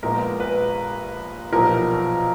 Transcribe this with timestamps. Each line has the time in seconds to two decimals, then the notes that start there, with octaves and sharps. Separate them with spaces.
0.03 A#1 A#2 G#3 B3 A#4
0.40 B4
1.52 B1 A#2 F3 B3 A#4